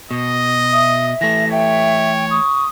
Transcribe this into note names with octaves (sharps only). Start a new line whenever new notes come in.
B2 D#5
E5 D#6
E3 A3 A#6
C#5 E5 G5
C#6 D#6